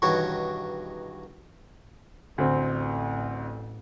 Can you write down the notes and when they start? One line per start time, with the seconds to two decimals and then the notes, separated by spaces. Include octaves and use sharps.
0.02 E2 G2 B2 D#3 F#4 C#5
2.38 A1 D2 C4